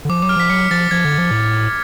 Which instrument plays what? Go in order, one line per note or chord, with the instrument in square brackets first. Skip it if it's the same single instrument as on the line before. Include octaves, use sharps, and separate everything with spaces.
[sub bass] D3
[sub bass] F3 [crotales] D6
[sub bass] F#3 [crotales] D6
[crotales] F6
[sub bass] F3 [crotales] B6
[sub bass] F#3 [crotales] C#7
[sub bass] F3 [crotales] A6
[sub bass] F3 [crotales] G#6
[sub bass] D3
F3
A2